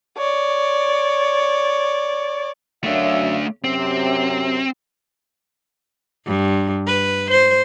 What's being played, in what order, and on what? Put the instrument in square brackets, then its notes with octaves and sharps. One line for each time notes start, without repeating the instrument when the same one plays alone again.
[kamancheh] C#5 D5
[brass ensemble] F#2 E5 F5 [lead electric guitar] A3 D4
[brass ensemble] F#2 C3 [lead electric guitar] C4
[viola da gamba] G2
B4
C5